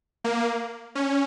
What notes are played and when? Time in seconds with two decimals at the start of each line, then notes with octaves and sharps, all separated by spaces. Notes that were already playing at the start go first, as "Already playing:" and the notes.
0.24 A#3
0.95 C#4